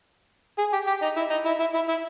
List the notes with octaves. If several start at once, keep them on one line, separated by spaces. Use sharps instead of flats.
G#4
G4
G4
D#4
E4
D#4
E4
E4
E4
E4